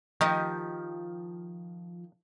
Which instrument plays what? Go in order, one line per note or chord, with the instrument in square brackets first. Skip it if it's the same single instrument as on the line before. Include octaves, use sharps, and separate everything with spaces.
[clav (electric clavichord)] D#3 [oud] F3 G4 D#5